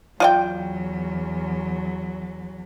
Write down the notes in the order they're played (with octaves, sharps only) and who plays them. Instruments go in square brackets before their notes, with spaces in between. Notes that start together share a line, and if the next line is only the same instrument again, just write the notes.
[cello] E2 F#3 [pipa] F4 D5 G5